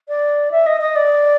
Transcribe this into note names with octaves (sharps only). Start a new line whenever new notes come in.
D5
E5
D#5
D#5
D5